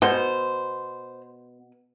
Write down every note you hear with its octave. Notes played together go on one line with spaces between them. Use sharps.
B2 B3 C5